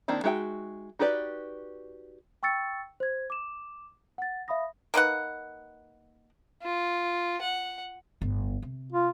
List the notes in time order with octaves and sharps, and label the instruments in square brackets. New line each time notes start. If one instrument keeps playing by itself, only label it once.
[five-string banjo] D#3 A#3 C4 D4 E4
G#3 D#4 F#4 E5 G5
D#4 F#4 G4 B4 D5
[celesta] G5 C#6 E6 A6 C#7
C5 G#6
D6 E7
F#5 A6
E5 F5 B5 D#6 A#6
[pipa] A#3 D#4 B4 F#5
[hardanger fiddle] F4
F#5
[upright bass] G1 A2
C3
[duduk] F4